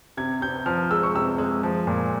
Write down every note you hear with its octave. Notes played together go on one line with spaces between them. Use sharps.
C3 G#6
C3 G6
F3 F6
G#3 E6
C#6
C3 E6
G#3
F3
A#2